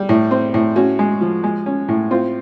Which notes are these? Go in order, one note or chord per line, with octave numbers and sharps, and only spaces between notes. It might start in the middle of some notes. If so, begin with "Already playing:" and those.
Already playing: G3
A2
C4
A2
C#4 F#4
G#3
F3
G#3
C#4
A2
C4 F4